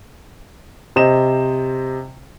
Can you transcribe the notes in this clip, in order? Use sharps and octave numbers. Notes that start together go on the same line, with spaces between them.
C3 C5 D#5 E7